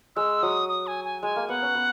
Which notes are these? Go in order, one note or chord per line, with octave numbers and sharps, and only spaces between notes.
G#3 E6
F#3 D#6
D#6
G#5
G#5
G#3 G#5
A#3
B3 F#5
C#4
B3